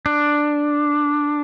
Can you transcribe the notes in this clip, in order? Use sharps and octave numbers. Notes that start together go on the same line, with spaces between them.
D4